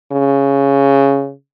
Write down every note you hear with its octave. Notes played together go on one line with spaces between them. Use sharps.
C#3